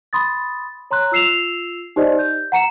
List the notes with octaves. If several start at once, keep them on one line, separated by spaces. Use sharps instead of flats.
B5 C6 D#6 A6
C#5 A#5 C6 F#6
F4 E6 C7 E7 F7
D#4 G4 C5 D5 D#5
G6
F#5 A#5 C#7 E7